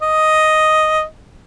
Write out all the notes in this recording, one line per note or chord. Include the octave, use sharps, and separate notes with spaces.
D#5